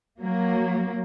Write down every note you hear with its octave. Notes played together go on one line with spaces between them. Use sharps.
F#3 A#3